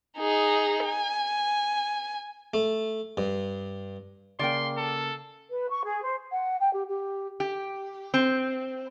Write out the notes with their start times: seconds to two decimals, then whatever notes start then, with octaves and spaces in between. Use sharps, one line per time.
0.18 D#4 G#4
0.85 G#5
2.54 A3
3.17 G2
4.39 C#3 A#3 D5 G5 C6
4.77 A4
5.50 B4
5.69 C#6
5.86 G#4
6.03 C5
6.32 F#5
6.60 G5
6.73 G4
6.89 G4
7.40 G4
8.14 C4